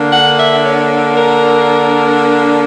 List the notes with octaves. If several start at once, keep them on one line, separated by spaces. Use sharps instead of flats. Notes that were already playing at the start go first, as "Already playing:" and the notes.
Already playing: D3 A#3 D4
F#5
E5
C#5
A#4